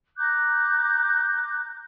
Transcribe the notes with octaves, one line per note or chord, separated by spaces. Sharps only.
A#5 D6 F#6 G6